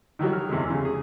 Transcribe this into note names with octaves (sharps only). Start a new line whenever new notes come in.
D#3 E3 F#3 G3
F6
E2 C3 E3 G#3
C#3
G#4